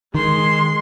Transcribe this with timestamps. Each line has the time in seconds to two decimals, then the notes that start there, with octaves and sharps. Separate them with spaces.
0.15 D#3 G#3 C6